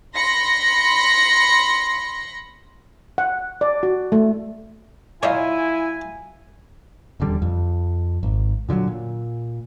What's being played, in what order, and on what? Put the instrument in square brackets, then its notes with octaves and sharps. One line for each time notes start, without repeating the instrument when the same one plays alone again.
[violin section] B5 C6 A#6 C#7
[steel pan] F#5
D5
F#4
A3
[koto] F#3 F4 C5 [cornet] E4 [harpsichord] C#5 D#5 E5 [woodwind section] G#5
[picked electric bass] D#1 E2 D3 G3
F2
G#1
A#2 D3 D#3 F#3
A#2